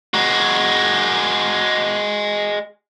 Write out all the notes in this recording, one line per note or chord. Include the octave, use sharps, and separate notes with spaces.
G#3 F#4